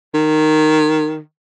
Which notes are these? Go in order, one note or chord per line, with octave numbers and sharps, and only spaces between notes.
D#3